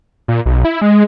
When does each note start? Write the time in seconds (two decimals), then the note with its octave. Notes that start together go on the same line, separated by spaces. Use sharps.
0.28 A#2
0.46 B1
0.65 E4
0.82 G#3